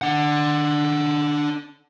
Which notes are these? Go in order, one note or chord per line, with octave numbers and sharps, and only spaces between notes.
D4 F#5